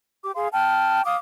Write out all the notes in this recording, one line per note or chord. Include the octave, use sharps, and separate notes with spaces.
G4 D6
G#4 F5 C6
G5 A5 F6
F5 D6 D#6